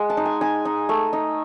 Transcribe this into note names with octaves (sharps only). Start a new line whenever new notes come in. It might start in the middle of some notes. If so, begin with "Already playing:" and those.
Already playing: G#3 F#5
A5
D#4
G#5
D#4 G#5
D#4
A3
D#4